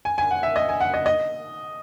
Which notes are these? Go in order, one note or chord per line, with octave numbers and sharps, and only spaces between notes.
G#5
G#5
F#5
E5
D#5
G#5
F#5
D#5
D#5